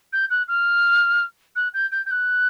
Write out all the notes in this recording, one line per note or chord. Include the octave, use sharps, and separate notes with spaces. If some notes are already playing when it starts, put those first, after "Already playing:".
G6
F#6
F6
F#6
G6
G6
G6
F#6